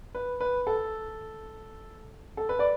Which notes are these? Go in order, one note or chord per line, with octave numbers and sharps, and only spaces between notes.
B4
B4
A4
A4
B4
D5